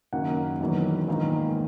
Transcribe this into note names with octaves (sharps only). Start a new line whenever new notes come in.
F#1 F#2 D#3 F#3 A#3 F#5
E1 E2 D#3 F#3
A#1 G#2 D#3 A#3